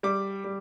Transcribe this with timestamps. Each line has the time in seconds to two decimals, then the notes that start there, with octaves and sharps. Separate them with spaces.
0.03 G3 D6
0.44 G3